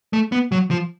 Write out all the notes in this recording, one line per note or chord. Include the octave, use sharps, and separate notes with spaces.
A3
B3
F#3
F3